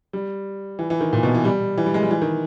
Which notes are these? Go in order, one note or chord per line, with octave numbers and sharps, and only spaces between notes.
G3
E3
E3
D#3
A#2
B2
E3
G3
E3
G3
G#3
G3
E3
D#3